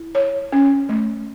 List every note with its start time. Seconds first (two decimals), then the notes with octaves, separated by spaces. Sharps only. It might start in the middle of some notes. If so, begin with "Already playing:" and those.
Already playing: E4
0.15 C#5
0.53 C#4
0.89 A3